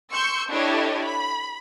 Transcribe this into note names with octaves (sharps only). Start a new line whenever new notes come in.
C6 C#6 E6 G6 C#7
D4 E4 G4 A4 C#5 D#5
B5